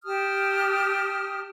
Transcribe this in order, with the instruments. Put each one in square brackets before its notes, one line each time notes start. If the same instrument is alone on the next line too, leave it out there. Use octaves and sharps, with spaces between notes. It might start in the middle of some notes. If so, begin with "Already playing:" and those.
[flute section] G4 A5 D#6 F6